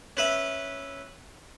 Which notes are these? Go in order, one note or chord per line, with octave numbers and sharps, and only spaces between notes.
C#4 B4 E5